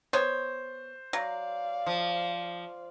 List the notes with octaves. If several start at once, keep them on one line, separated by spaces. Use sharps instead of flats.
B3 C5 C#5
F#3 D5 F5
F3